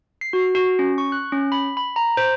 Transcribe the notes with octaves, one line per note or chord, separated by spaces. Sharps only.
C7
F#4
F#4
C#4
C#6
F#6
C#4
B5
B5
A#5
C5